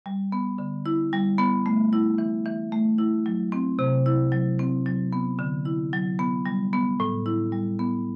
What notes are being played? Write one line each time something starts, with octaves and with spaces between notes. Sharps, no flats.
G3
B3
D3
E4
G3
B3
A3
E4
E3
E3
A3
E4
F#3
C4
C3
E4
F#3
C4
F#3
B3
D3
E4
F#3
B3
G3
B3
A2
E4
G3
B3